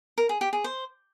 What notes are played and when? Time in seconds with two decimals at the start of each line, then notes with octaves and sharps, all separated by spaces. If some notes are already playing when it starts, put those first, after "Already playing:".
0.18 A#4
0.29 G#4
0.41 G4
0.53 G#4
0.64 C5